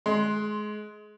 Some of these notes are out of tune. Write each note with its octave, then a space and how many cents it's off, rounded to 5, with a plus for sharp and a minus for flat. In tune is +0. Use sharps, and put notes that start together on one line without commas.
G#3 +25 C6 +0